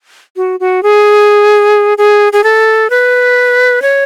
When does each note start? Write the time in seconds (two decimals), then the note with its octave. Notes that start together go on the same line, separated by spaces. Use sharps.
0.36 F#4
0.60 F#4
0.83 G#4
1.98 G#4
2.33 G#4
2.44 A4
2.90 B4
3.82 C#5